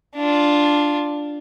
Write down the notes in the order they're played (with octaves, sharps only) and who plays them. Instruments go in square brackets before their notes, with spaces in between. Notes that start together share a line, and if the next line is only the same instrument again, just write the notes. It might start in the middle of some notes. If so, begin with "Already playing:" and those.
[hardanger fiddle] D4 F4